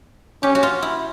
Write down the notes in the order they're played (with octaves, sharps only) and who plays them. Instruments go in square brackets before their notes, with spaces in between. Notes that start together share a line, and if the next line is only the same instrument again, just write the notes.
[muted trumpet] C#4 [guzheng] G4
[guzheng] F#4
F4
E4